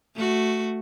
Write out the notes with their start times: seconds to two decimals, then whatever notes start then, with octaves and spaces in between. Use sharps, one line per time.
0.16 A3 F#4